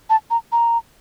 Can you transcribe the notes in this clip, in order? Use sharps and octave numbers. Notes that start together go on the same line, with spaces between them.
A5
A#5
A#5